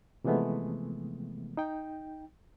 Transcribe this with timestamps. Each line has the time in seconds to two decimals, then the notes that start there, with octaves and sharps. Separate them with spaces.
0.24 C3 E3 F3 G#3 A3 B3
1.57 D#4 G5